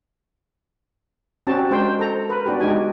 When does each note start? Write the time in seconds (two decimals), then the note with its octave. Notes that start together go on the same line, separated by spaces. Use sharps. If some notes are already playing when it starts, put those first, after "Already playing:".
1.47 C4 C#4 F#4 G4 A5
1.70 G#3 D4 A#4 C5 G5
1.99 A4 C5 A#5
2.29 A#4 B4
2.46 B3 D4 F#4 G4
2.60 G#3 D4 D#4 G4 G#5